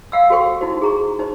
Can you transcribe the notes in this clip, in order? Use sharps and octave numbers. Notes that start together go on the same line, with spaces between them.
F5 F#5 E6
F#4 A4 C5 G5 C#6
D#4 E4 F#4 C5
G#4 A#5 C#6
D#4 C5